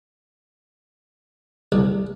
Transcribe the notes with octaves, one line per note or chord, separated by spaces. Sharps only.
C2